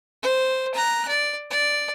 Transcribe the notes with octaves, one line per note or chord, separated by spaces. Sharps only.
C5
A#5 F#6
D5
D5